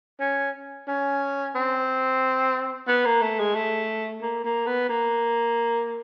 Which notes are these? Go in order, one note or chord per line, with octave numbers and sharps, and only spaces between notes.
C#4
C#4
C4
B3
A#3
A3
G#3
A3
A#3
A#3
B3
A#3